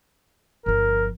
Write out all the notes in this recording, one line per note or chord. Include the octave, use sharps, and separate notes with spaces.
G1 F3 A#4